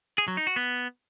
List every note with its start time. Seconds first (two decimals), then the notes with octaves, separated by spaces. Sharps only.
0.18 G#4
0.28 F#3
0.37 D#4
0.47 F#4
0.56 B3